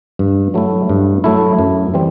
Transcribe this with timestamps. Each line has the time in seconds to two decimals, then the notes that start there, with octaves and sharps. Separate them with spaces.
0.19 G2
0.54 F#3 A3 E4
0.89 G2
1.24 F#3 A3 E4
1.59 F#2
1.94 E3 G3 C4